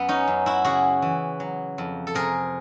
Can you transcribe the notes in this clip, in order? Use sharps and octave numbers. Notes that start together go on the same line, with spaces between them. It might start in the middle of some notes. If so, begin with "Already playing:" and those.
Already playing: F#2 B3
C#4 D#4
F#2
E4 F#4
C#3 F#4 G#4
E3
F#3
F2
A4
C3 G#4 A#4